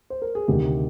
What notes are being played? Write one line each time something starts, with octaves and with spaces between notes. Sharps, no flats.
C5
A#4
G#4
D2 C3 D#3 G4